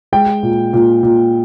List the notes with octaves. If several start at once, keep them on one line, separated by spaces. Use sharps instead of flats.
G#3 G5
A#2
A#2
A#2